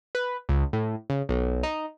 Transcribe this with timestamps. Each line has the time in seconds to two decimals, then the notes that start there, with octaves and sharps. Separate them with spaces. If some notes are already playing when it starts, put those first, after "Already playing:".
0.15 B4
0.49 C#2
0.73 A2
1.10 C#3
1.29 B1
1.63 D#4